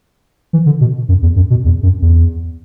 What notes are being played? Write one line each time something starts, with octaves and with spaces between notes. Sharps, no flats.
E3
D3
B2
F#2
E2
F#2
B2
E2
F#2
E2